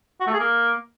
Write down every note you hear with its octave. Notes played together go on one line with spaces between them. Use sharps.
F#4
A3
G#4
A#3